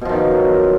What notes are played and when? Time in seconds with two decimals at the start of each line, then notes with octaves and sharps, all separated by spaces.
0.01 B2
0.05 F3
0.09 D#3
0.13 F#2